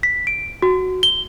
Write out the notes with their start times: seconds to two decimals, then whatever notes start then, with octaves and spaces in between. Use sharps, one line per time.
0.03 B6
0.27 D7
0.62 F#4
1.03 G7